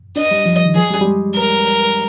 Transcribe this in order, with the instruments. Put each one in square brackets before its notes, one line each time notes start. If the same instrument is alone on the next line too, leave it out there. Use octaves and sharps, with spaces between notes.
[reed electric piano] D4 [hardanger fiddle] D#5
[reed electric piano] G3
F3
D#3
[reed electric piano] F3 [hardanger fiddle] G#4
[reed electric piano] G3
G3
G#3
[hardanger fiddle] A#4